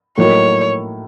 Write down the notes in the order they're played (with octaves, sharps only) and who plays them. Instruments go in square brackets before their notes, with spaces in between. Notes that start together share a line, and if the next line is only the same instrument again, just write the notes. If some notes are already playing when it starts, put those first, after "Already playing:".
[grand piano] A2 F#3 A#3 D#4 F#4 [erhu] C#5